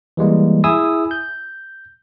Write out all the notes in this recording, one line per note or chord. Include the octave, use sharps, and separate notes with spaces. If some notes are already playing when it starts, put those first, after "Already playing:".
E3 G3 G#3 A#3
E4 G#4 G#5 D#6 E6
G6